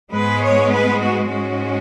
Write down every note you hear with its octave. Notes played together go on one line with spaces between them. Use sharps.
G#2 G#3 B3 B4
C#5
B4
F#4
G#2 G#3 C#4 F#4